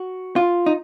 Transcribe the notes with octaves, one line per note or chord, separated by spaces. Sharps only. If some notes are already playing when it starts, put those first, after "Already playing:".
Already playing: F#4
F4
D#4